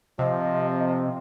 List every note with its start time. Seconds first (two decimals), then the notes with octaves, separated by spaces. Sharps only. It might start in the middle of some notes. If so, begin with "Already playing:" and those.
0.19 C3 F3 D#5